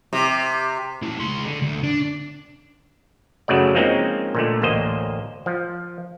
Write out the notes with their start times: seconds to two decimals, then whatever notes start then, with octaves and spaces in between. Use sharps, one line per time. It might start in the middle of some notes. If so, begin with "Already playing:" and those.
0.13 C3
1.02 C#4 E4
1.20 C#2 C6
1.45 D3
1.62 D2
1.83 D4
3.48 F#2 C#3 F#3 A3 D5
3.75 F3 G#3 A#3 C4 C#4 D#4
4.35 A#2 D3 A3
4.62 A1 D2 A#3 C5 D#5
5.46 F3